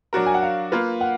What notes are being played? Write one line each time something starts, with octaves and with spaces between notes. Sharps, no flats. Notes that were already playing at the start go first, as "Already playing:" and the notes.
F#3 D4 F#4 A#4
G#5
F#5
F5
A#3 F4 B4
F#5